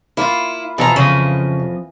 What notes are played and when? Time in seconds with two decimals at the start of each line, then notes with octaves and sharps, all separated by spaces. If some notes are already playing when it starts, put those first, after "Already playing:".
0.17 A#3 E4 F4
0.78 F2 B2 E3 F4 A4 A#5
0.96 F2 C#3 D#5